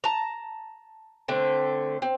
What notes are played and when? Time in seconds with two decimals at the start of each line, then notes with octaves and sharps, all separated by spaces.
0.04 A5 A#5
1.28 D3 A3 C4
2.02 C4